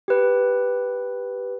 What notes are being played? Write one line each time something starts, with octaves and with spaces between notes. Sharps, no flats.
G4 B4